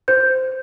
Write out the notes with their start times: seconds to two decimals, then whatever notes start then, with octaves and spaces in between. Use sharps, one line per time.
0.08 C5 G6